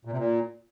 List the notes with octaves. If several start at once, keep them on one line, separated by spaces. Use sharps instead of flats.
A#2
C3
A#2